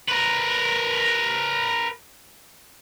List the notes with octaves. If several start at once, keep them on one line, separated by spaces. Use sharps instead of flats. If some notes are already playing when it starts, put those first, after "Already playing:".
A#4 B4